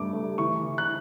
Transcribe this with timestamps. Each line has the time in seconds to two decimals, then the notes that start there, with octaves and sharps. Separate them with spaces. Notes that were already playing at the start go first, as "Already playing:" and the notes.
Already playing: G2 A3 D6
0.13 A3
0.38 E3 C#6
0.63 E3
0.78 F#6